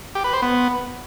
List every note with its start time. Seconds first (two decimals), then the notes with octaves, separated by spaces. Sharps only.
0.15 G4
0.24 B4
0.33 C5
0.42 B3